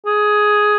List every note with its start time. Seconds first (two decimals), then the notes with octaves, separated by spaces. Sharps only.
0.06 G#4